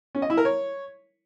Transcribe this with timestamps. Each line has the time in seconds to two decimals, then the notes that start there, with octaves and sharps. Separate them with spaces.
0.15 C#4
0.22 D#5
0.30 E4
0.37 A#4
0.45 C#5